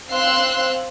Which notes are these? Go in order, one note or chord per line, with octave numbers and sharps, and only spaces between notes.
C4 C5 F5 C6 E6 F#6